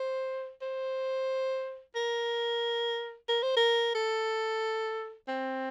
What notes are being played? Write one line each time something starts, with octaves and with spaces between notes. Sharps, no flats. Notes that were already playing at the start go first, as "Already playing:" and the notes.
Already playing: C5
C5
A#4
A#4
C5
A#4
A4
C4